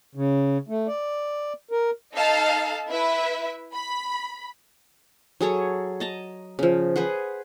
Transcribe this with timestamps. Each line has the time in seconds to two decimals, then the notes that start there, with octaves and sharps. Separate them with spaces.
0.15 C#3
0.68 A3
0.87 D5
1.71 A#4
2.15 D#4 A4 D#5 F5 A5
2.90 E4 B4 E5
3.73 B5
5.41 F#3 G#4 A4 C#5
6.00 D#5 A5 A#5
6.59 C#3 F3
6.96 G#4 B4 C5 F#5